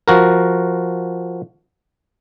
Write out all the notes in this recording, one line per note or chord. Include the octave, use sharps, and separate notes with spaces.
F3 F#4 A#4